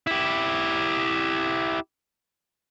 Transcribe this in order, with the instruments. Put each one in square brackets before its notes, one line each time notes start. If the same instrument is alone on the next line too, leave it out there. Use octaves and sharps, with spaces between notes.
[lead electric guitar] E4 G4